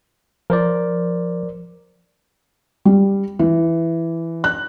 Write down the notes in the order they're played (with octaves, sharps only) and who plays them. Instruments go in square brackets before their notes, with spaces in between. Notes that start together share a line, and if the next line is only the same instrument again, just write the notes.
[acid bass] F3 [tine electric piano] A#4 C5 D5
[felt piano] G3
E3
F#6